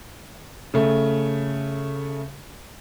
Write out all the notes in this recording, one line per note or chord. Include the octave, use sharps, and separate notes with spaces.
C#3 A3